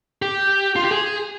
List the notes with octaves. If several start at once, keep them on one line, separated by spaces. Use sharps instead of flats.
G4
F4
G4
G#4